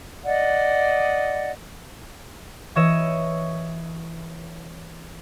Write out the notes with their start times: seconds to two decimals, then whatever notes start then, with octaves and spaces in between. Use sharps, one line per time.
0.24 D5 D#5 F#5
2.75 E3 C#5 D#5 C#6 E6 E7